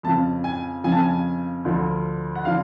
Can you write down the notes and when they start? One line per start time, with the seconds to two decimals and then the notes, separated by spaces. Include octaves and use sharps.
0.03 F2 C#3 F3 A5
0.44 G#5
0.84 F2 C#3 F3 G#5
0.92 A5
1.00 G#5
1.65 D2 D3 F3
2.35 F#5
2.45 D3 F3 F5